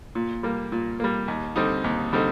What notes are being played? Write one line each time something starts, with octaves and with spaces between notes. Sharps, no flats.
A#2
G3 A#3
A#2
G3 A#3
D#2
D3 G3 C4 D#4
D#2
D3 G3 C4 D#4